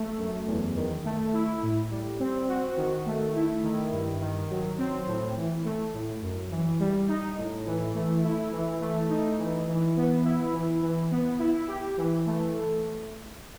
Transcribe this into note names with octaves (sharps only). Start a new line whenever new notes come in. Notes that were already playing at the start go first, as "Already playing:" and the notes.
Already playing: A3
F#2
E2
D#3
A3
E4
A2
G3
C4
F#4
D#3
A3
E4
D#3
G2
D#3
F#3
C4
A2
E3
A3
A2
F#2
E3
G3
D#4
A2
E3
A3
E4
E3
A3
D#4
E3
E3
B3
E4
E3
E3
B3
E4
G4
E3
A3